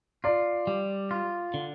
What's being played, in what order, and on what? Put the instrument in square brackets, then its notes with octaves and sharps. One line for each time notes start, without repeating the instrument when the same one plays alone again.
[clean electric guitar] F4 [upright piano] D5
[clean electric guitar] G3
F4
D3